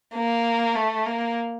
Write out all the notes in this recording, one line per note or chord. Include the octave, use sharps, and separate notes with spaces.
A#3
A3
A#3